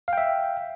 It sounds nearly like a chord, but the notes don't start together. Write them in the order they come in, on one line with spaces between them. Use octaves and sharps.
F5 G5 E5